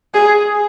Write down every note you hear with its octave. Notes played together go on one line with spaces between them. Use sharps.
G#4